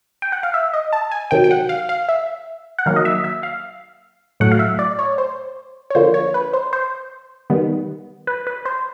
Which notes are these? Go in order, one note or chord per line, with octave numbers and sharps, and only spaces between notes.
G5
F#5
F5
E5
D#5
A5
G#5
C3 D#3 F#3 G5
G5
F#5
F5
F5
E5
F#5
D#3 F#3 A#3 F5
D#5
E5
E5
F5
A2 F#3 A3 F#5
F5
E5
D5
C#5
C5
C#5
D3 F3 A#3 C5
C#5
B4
C5
C5
D#3 G3 B3
B4
B4
C5